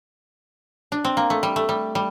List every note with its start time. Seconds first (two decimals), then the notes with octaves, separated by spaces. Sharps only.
0.92 D4
1.04 C4
1.17 A#3
1.30 A3
1.43 G3
1.56 A3
1.69 G3
1.95 G3